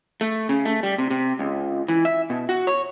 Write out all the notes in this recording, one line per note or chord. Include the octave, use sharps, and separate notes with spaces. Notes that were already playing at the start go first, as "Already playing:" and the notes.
A3
C#3
A3
G3
C3
C3
C#2
E3
E5
B2
F#4
C#5